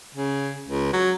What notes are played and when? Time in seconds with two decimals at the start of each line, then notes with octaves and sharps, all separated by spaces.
0.14 C#3
0.67 C#2
0.93 F#3